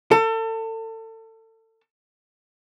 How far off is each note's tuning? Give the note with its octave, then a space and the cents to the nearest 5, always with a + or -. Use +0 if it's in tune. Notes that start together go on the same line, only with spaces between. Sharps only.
A4 +30